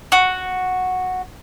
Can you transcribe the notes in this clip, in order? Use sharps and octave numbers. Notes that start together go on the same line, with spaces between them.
F#4